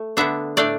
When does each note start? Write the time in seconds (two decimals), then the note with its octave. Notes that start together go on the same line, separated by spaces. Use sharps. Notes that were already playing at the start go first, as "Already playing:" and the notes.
Already playing: A3
0.17 D3 B3 D4 E5
0.57 A2 A3 D4 D5